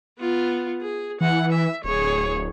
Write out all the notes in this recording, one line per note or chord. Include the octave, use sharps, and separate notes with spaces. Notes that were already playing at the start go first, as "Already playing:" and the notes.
B3 F4
G#4
E3 F#5
E5
D1 G#4 C#5